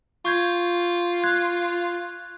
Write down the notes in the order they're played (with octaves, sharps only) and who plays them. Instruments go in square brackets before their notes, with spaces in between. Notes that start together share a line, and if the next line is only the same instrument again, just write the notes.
[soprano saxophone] F4 [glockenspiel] C#6 G6 G#6
[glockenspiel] F#6 G#6